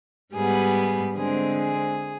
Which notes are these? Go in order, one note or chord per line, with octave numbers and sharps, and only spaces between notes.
G#2 G3 B3 G#4
D3 G#3 C4 G#4
G#4